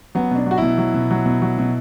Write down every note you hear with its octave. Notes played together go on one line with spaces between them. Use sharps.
F#3 B3
B2 D4
F#3 F#4
B2 E4
F#3
B2
F#3
B2
F#3
B2